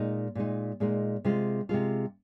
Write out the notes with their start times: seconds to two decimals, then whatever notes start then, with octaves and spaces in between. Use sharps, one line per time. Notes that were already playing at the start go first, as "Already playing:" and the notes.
Already playing: A#2 G#3 D#4
0.35 A#2 G#3 D#4
0.80 A#2 G#3 D#4
1.24 C3 G#3 F4
1.69 C3 G#3 F4